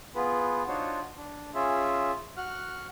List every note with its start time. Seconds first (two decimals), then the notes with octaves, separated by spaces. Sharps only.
0.15 B3 F4 G#4 B4
0.68 D4 D#4 F4 F#4 C5 C#5
1.17 D4
1.54 C#4 F4 G#4 E5
2.37 F#4 F6 F#6